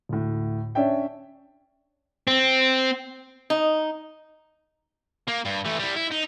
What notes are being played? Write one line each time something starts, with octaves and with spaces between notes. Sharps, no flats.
D2 A2
C#4 D4 C#5 E5 G5
C4
D#4
A#3
G2
E3 A3
G3 E4
E4
D#4